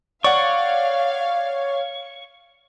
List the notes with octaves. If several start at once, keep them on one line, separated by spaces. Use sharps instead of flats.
C#5 D5 F5 F#5 C#6